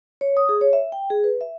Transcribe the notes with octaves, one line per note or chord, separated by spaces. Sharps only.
C#5
D#6
G#4
C#5
E5
G5
G#4
B4
E5